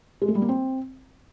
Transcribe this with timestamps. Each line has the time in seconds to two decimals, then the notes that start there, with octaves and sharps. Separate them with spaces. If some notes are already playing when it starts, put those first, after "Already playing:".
0.22 G#3
0.28 A3
0.35 G3
0.42 A#3
0.49 C4